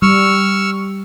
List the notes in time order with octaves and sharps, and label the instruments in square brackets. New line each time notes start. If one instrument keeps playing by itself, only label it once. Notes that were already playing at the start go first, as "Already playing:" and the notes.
[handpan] G3 [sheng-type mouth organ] C#6 E6 F6